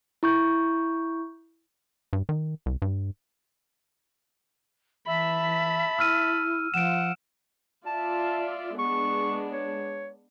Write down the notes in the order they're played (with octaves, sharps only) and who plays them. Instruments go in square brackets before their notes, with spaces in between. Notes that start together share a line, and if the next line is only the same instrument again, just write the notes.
[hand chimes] E4 C#6 G6
[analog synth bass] G2
D#3
C2
G2
[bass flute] E3 [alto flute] E5 [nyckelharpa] A5 B5
[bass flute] E4 [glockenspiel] E6 F6 D#7
[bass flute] F3 [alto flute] F#5 [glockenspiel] D7 E7
[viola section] F4 D5 E5 [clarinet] A5
[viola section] G#3 B3 D4 [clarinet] C#6
[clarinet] C#5